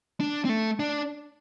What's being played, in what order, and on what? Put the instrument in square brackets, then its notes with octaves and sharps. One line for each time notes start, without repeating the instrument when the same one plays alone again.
[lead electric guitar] D4
C4
A3
D4